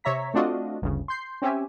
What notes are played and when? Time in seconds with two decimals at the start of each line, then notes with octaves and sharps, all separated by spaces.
0.04 C3 C#5 E5 A#5 B6
0.34 A3 C4 D4 F4 F#4 D#5
0.82 G1 D2 C#3
1.08 C6 G6 C7
1.42 C4 C#4 G4 E5 G#5